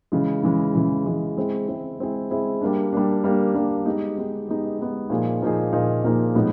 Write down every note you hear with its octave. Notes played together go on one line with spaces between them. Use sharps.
C#3 E3 G#3
C#3 E3 G#3
C#3 E3 G#3
C#3 E3 G#3
G#3 C4 E4 G#4
G#3 C4 E4 G#4
G#3 C4 E4 G#4
G#3 C4 E4 G#4
G3 A#3 D4
G3 A#3 D4
G3 A#3 D4
G3 A#3 D4
G#3 B3 D#4 G4
G#3 B3 D#4 G4
G#3 B3 D#4 G4
G#3 B3 D#4 G4
A#2 F3 A#3 D#4 G#4
A#2 F3 A#3 D#4 G#4
A#2 F3 A#3 D#4 G#4
A#2 F3 A#3 D#4 G#4
A2 F3 G#3 B3 D#4